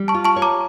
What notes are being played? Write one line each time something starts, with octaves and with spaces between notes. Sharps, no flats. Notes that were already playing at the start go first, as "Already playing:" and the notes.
Already playing: G3
A5 C#6
F4
A5 C#6
C#5
A#5 D6